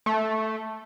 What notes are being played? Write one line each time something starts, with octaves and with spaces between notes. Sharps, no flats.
A3